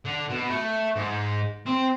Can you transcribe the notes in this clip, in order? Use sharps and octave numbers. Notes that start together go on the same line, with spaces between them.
D3
B2
A3
G#2
C4